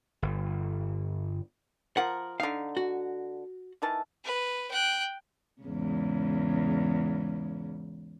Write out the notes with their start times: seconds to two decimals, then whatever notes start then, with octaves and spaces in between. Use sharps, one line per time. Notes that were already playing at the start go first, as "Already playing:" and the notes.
0.22 G1
1.97 F3 A#4 F#5
2.40 D3 D#4 F5
2.77 F#4
3.82 D#3 E3 A5
4.24 B4
4.71 G5 F#6
5.62 E2 G#2 C#3